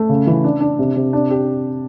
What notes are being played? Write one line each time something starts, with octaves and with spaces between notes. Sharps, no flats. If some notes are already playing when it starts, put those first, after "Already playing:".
Already playing: A3
C#3
E3
D4
D4
C3
C3
D4
G4